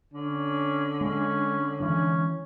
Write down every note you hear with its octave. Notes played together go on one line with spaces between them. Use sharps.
D3 C#4
G#3 C#4
D#3 E3 G#3 C#4